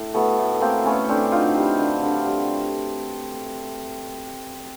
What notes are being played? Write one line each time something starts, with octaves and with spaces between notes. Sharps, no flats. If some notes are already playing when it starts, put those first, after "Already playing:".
Already playing: A2
F#3 A3 B3
A2
A3 A#3 C4
A3 B3 C#4
A2 C4 D4
F#3 D#4 F4
G3
D3
D3
G3